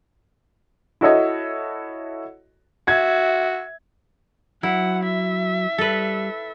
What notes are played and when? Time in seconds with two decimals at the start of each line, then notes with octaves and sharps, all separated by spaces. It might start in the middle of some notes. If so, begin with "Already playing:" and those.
1.01 E4 F#4 A4 C#5 D#5
2.88 F#4 E5 G#6
4.63 F#3 E4 F#5
5.04 E5
5.78 G3 A4 B4